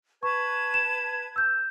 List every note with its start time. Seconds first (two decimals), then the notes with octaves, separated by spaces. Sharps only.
0.23 B4 A5 C#6 G#6
0.74 E7
1.36 E6 G6